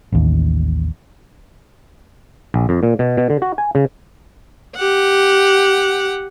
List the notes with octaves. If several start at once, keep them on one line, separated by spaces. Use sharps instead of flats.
A1 D#2
A#1
F2
A#2
B2
B2
D3
F#4
G#5
C#3
G4 F#5